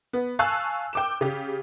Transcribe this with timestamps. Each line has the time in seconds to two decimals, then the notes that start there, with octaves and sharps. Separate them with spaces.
0.13 B3
0.39 F5 G#5 A5 C#6 E6 F#6
0.93 G5 D6 E7
1.21 C#3 G4